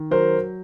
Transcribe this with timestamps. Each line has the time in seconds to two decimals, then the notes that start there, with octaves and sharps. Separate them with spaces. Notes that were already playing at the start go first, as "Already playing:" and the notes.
Already playing: D#3
0.11 F#3 A#4 C5